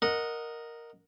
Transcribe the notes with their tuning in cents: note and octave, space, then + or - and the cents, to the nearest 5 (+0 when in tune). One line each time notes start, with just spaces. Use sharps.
A#4 +0 D#5 +0 F#5 -15